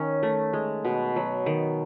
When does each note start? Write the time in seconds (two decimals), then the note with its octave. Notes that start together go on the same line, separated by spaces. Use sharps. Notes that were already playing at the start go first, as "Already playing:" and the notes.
Already playing: D#3 C#4
0.23 A3
0.53 G#3
0.85 B2
1.16 F#3
1.46 D#3